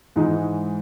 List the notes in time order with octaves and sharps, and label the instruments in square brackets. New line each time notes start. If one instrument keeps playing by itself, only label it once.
[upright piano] G#2 E3 G#3 D#4